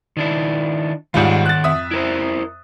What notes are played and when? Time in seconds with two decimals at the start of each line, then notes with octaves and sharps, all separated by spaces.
0.17 D#3 D4 E4
1.14 G#2 D#3 G3 F4 C#5 F#5
1.46 F#6 A6
1.64 F2 E5 D#6
1.91 E4 A#4 C5